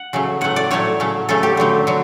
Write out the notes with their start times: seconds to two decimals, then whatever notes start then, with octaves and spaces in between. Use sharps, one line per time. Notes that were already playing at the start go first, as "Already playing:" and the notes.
Already playing: F#5
0.13 C#3 F#3 A3
0.41 A2 F#3 A3 F#5
0.56 D5
0.71 A2 F#3 A3 C#5
1.00 C#3 F#3 A3
1.29 C#3 F#3 A3 A4
1.43 G4
1.57 D3 F#3 A3
1.87 D3 F#3